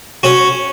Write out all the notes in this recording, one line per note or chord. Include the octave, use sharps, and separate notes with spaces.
C#4 F#4